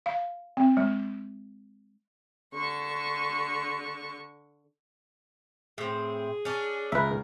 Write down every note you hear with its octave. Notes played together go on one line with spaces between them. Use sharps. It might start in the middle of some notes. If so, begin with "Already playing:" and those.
F5
C4
G#3
D3 C#6
A2 C4 G#4
C#4 D4
C#2 A#4 B4 E5